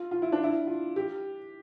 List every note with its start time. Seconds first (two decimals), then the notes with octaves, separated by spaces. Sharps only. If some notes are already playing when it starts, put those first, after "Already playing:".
Already playing: F4
0.11 F4
0.22 E4
0.32 D4
0.43 E4
0.67 F4
0.96 G4